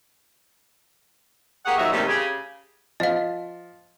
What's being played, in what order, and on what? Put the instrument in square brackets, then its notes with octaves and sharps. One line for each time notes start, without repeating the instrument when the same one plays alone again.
[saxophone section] A#3 G4 G#4 C#5 F#5
D#2 A#2 F#3 D#4 E5
C3 D#3 E3 G3 A3 C#4
C#3 G4 G#4
[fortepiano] F3 [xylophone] D#5 F5